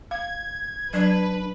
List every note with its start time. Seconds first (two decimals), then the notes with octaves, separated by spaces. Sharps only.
0.11 F5 G#6
0.93 F#3 D4 B4 D5